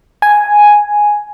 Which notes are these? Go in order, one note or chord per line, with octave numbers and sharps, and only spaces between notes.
G#5